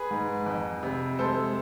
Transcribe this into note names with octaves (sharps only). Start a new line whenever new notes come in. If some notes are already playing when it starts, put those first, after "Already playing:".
Already playing: G#4 B4
G#2
F2
C3
G#3 A4 C5